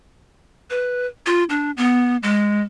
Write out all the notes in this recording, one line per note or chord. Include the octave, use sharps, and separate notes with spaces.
B4
F4
D4
B3
G#3